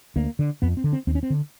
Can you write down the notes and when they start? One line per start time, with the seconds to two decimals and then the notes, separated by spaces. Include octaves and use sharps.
0.16 D2 A#3
0.39 D3
0.62 F2 B3
0.77 C4
0.84 D3
0.93 C4
1.07 D#2 C4
1.15 C#4
1.23 C4
1.30 D3